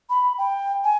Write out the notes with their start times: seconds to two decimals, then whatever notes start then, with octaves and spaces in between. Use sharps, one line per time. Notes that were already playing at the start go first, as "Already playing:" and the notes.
0.10 B5
0.38 G5
0.84 G#5